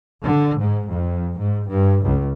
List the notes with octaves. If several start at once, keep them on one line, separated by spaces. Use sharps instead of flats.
D3
G#2
F2
G#2
G2
C#2